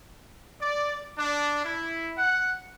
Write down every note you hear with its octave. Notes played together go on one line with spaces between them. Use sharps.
D5
D4
E4
F#5